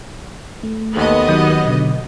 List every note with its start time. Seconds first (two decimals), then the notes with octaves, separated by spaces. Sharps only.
0.63 A3
0.95 D#2 B3 A4 D#5
1.29 D#3 F#3 G4 G6
1.65 B2 D3